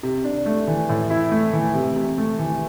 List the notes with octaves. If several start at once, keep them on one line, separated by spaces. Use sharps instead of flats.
C3
D4
A3
E3
A2
E4
A3
E3
C3
C3
A3
E3